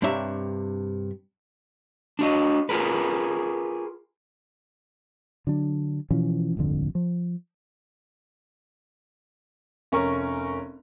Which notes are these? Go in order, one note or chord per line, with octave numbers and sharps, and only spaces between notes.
G2 C3 D4 C#5 E5 A#5
D4 F#4 D#5
F4 G#4 A#4 B4
D3 F#3 D4
B2 E3 F3 C#4
D#1 G#1 F2 D3
F3
F1 C#4 A#4 C#6